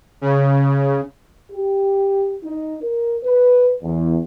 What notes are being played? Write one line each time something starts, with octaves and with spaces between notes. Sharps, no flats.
C#3
G4
D#4
A#4
B4
E2